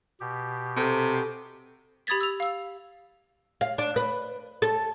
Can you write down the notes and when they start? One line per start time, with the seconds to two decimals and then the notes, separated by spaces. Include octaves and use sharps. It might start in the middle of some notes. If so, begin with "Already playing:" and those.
0.20 B2 G4
0.77 C3 A4
2.07 G4 B5 D#6 G#6 A6 B6
2.21 E6 F7
2.40 F5 E6
3.61 F5
3.78 D4
3.96 B4
4.62 A4